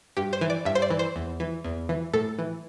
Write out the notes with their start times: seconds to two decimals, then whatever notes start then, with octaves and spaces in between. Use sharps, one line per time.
0.17 G2 G4
0.33 C5
0.41 E3
0.50 D5
0.65 G2 E5
0.75 C5
0.82 D5
0.90 E3
0.99 C5
1.16 E2
1.40 E3
1.64 E2
1.89 E3
2.14 A2 A4
2.39 E3